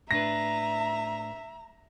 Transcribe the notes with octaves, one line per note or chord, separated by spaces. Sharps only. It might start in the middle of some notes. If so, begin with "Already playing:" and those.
A2 D4 B4 E5 A#5 A#6